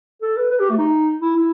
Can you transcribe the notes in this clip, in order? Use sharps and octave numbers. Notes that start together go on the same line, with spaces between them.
A4
B4
B4
G4
A3
D#4
E4
E4